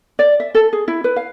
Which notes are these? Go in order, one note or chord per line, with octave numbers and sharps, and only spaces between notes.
D5
E5
A4
G#4
E4
B4
F5